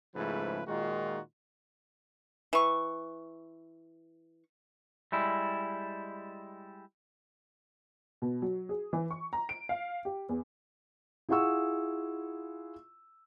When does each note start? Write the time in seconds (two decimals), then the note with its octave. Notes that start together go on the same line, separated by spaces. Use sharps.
0.16 G#2 C#3 F3 A3 E4 B4
0.67 A#2 D#3 G#3 D#4 F4 F#4
2.53 E3 C#6
5.12 G3 G#3 E4
8.22 B2
8.42 F#3
8.69 G#4
8.93 E3
9.11 C#6
9.33 A#5
9.49 D7
9.69 F5
10.05 G4
10.29 E2
11.29 E4 F4 G#4 F#5 C#6 E6